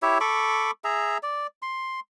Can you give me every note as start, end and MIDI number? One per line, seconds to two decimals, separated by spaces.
0.02 0.18 64
0.02 0.18 67
0.02 0.18 73
0.02 0.18 76
0.21 0.71 69
0.21 0.71 83
0.21 0.71 85
0.21 0.71 86
0.84 1.18 68
0.84 1.18 76
0.84 1.18 82
1.23 1.47 74
1.62 2.00 84